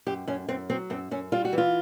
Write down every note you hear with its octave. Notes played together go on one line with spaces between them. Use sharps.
F#2 G4
F#2 C#4
F#2 C4
F#3 C4
F#2 C4
F#2 C#4
G3 F4
F#4
E3
F4